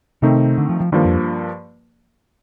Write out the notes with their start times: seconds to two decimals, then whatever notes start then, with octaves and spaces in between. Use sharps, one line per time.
0.22 C3 D#3 A3 C4 D#4
0.58 D3
0.69 F3
0.80 F3
0.92 G2 D#3 F3 A#3
1.04 F2